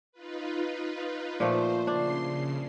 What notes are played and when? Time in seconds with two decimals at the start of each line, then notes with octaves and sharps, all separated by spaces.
0.12 D#4 F4 B4
1.40 A#2 F3 A3 C5
1.87 C#3 D4 C6 C7
2.22 C#3